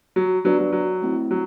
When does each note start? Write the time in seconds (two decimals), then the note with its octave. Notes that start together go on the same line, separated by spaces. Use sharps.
0.16 F#3
0.45 F#3 B3 D4 F#4 B4 D5
0.58 F#3
0.73 F#3
1.02 A3 C4 E4
1.31 F#3